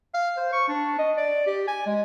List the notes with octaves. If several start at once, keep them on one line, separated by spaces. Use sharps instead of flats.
F5
C5
C#6
D4
D#5
D5
G4
G#5
G#3